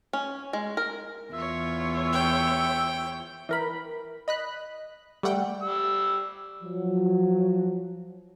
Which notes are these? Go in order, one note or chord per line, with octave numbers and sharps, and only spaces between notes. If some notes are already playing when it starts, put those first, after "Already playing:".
C#4
G#3
A#4
E2 F4 C#5 E5
G5
E3 A#4 B5
D#5 B5 F#6
G3 A3 F#5 G5
G3 E6
F3 F#3